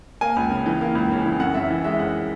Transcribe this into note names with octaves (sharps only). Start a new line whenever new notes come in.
A#3 G#5
C#2
C#3
E3
A#3
C#2
C#3
E3
F#2 F#5
F#2 E5
E3
G#3 E5
F#2 F#5